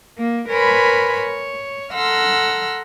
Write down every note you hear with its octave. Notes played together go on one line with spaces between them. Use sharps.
A#3
A#4 B4 C#5 G#5 B5 C6
C#5
A4 F#5 A#5 C6 E6 F6